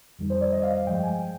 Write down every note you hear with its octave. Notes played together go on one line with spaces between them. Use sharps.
F2 D#3 G3
C5
D5
D#5
F5
F5
G2 F3 G#3 G5
G#5
G5